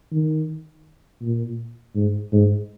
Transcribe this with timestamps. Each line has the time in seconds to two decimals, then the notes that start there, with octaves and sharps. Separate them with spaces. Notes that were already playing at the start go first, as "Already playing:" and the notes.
0.12 D#3
1.22 A#2
1.95 G#2
2.32 G#2